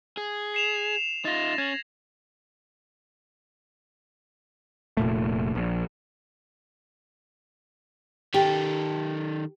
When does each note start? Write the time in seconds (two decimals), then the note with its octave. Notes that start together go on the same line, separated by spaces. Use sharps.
0.17 G#4
0.54 C7 E7 F7
1.25 D#4 F4 A6 A#6
1.58 C#4 G#6 F#7
4.97 F1 A#2 A3
5.55 A#1
8.34 D#3 G4 A4